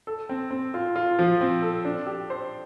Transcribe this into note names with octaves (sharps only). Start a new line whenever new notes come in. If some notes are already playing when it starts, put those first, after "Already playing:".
A4
C4
C4
F4
F4
F3
C4
A4
D4
G4
C5